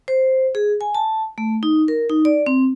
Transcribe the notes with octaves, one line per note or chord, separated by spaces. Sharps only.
C5
G#4
G#5
A5
A3
D#4
A#4
D#4
D5
C4